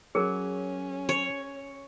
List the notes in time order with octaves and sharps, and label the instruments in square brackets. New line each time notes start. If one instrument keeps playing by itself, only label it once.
[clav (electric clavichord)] F#3 [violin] C#4 [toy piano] G#4 A#4
[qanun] C#5